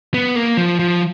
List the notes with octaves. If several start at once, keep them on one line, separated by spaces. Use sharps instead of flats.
B3
A#3
F3
F3